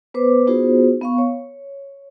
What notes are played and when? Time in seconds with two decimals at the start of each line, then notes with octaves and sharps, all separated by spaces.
0.14 B3 B4 C5 D6
0.47 B3 D#4 F4 F#4 G#4 C5
1.02 B3 F5 C#6
1.18 C#5